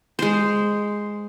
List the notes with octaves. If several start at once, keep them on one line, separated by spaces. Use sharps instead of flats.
G#3 C5